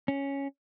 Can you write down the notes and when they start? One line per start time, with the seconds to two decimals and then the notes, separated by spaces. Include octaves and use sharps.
0.08 C#4